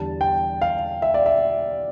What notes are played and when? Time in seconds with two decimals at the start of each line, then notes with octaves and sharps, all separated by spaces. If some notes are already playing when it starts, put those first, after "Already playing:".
Already playing: E2 D3 G3 A5
0.21 G5
0.62 F5
1.02 E5
1.14 D5
1.26 E5